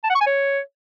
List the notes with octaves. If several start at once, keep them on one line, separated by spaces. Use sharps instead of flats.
A5
F#5
C#6
G#5
C#5